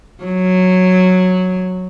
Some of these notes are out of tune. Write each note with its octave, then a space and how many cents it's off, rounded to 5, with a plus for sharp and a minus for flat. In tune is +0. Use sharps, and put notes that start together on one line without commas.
F#3 -5